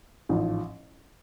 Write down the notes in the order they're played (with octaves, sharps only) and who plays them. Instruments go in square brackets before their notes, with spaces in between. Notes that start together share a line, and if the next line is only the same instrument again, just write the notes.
[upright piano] A1 G#2 F3